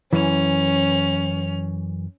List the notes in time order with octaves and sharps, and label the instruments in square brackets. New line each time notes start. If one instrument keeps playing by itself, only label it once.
[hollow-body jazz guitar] F#2 E3 [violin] C#4 F7